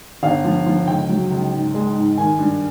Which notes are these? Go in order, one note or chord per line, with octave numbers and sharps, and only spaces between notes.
G1 F5
F3
F3
C#2 G5
F#3
C#2
G#2
G#3
G#2
D#3 G#5
G2